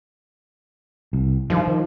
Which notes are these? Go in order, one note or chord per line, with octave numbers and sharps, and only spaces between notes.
C2
G2 D#3 F3
D#3